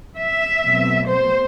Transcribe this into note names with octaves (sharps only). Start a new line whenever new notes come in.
E5
B2 F#3 A3 C4
C5